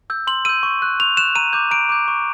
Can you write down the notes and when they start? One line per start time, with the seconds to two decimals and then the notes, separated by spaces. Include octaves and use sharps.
0.10 E6 G6
0.27 C6 F#7
0.45 E6 G6 D#7
0.63 C#6
0.82 F#6
1.00 C#6 F7
1.17 F#6 E7
1.35 A#5 D#7
1.53 D6 G6
1.71 A#5 D7
1.89 D6 G6
2.08 C#6